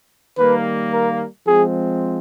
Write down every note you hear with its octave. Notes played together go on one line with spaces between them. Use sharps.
D#3 G3 A#3 B4
A#4
F3 G#3 C4 G#4